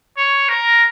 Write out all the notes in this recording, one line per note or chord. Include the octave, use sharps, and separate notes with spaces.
C#5
A#4